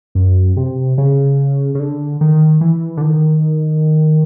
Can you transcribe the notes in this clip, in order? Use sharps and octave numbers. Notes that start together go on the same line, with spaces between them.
F#2
C3
C#3
C#3
D3
D#3
E3
D3
D#3